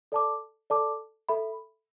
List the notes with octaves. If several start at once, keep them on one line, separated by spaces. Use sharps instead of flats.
A4 D5 A5 D6
A4 D5 A5 D6
A4 E5 B5